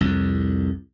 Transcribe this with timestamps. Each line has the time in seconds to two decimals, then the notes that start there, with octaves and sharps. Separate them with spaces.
0.01 C2 F2